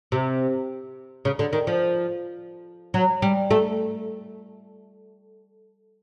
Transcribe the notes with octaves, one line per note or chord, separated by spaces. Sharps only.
C3
C#3
D3
D#3
F3
F#3
G3
A3